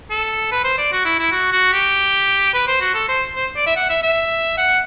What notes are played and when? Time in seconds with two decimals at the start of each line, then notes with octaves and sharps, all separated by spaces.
0.10 A4
0.52 B4
0.64 C5
0.78 D5
0.92 F#4
1.05 E4
1.19 E4
1.32 F#4
1.52 F#4
1.73 G4
2.54 B4
2.67 C5
2.81 F#4
2.95 A4
3.08 C5
3.35 C5
3.56 D5
3.67 E5
3.76 F#5
3.89 E5
4.03 E5
4.57 F#5